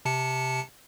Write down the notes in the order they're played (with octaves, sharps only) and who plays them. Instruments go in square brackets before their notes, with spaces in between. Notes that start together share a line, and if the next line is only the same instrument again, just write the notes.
[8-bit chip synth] C3 A5 C#7